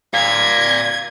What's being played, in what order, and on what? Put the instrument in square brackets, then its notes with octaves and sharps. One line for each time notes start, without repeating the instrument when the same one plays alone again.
[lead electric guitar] D5 F5 [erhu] G#6